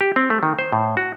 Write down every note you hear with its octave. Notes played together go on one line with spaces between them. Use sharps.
G4
C4
A3
D#3
C5
A2
F#4